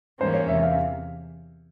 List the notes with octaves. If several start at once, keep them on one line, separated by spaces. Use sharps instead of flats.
G#2 E3 G3 A#3 C#4 C5
C#5
E2 C3 E3 E5
F5